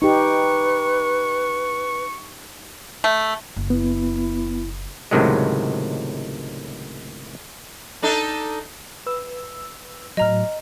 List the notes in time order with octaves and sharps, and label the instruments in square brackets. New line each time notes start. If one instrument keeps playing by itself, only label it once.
[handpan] D#4 G4 [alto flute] B4 [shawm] C#6
[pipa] A3
[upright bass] F#1
[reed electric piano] B3 [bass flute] E4
[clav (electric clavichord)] C#2 A2 C3 D#3 F#3 G#3
[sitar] D4 D#4 A4
[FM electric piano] B4 E6
[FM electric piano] A2 F#3 [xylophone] D#5 A#5 F6